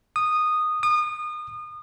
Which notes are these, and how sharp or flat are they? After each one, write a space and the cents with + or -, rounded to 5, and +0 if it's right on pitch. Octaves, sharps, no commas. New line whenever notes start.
D#6 -10
D#6 -30